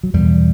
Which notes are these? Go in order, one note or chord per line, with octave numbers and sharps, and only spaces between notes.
F#3
E2 B2 G3